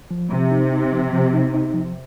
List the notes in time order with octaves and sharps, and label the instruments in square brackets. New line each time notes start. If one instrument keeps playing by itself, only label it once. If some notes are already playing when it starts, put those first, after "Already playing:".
[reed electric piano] F3
[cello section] C3 [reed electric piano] F3
[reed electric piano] D#4
D#4
F3
F3
D#4
D#4
F3